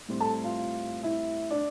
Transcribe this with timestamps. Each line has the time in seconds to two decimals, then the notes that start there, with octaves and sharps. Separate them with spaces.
0.09 A2 G3 C4
0.20 A4 A5
0.44 F4 F5
1.03 E4 E5
1.51 D4 D5